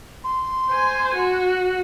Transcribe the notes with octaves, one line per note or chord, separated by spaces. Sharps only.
C6
C5 G#5
F#4